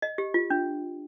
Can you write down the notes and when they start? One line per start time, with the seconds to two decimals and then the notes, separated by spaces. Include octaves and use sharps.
0.02 D#5
0.18 G4
0.34 F4
0.50 D4